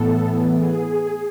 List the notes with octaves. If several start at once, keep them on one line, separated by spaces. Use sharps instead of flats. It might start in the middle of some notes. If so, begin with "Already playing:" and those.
Already playing: A2 E3 B3 A4
G#4